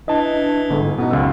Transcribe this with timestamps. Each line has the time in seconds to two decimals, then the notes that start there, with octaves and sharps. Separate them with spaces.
0.08 E3 D4 D#5 A5
0.41 D4
0.70 G1 G#2 A4
0.98 B2 B3 C#4 D#4
1.11 C#2 F#2 E6